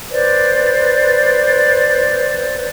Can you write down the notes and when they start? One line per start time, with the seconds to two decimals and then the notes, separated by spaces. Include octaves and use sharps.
0.10 B4 C5 D5